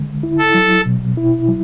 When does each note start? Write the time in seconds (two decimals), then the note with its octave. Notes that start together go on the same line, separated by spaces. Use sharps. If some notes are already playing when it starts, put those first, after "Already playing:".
Already playing: D3 G#3
0.23 E4
0.39 A4
0.54 F#3
0.86 B2
1.17 E4
1.48 F#3